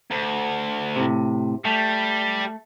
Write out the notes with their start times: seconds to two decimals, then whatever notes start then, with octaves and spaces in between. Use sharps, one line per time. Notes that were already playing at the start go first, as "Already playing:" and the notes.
0.11 D2
0.96 A2 C3
1.65 G3 A3